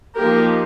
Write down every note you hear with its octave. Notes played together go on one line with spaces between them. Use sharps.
F3 A#3 D#4 G4 A#4